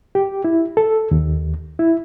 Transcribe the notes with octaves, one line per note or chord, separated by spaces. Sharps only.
G4
E4
A4
D#2
E4